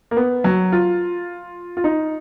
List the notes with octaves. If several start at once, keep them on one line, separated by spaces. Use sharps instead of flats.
A#3
B3
F#3
F4
F4
D#4